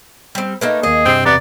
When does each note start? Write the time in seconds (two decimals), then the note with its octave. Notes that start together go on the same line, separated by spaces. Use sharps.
0.35 G3 C4
0.61 A3 A#3 D#4 B4
0.83 D#2 A#3 G#4 D#5
1.06 G2 C3 C4
1.26 E2 C3 B3 D5 A#5